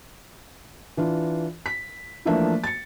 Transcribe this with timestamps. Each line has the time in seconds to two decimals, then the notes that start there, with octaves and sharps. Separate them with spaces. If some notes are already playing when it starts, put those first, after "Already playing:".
0.97 E3 D4 F4
1.66 B6
2.25 E3 F3 A3 A#3 D4 E5
2.64 A6 C#7